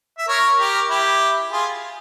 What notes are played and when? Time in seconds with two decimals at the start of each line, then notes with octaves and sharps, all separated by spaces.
0.18 E5
0.28 A#4 C#5
0.59 G4 A#4
0.89 E4 G4
1.51 F4 G#4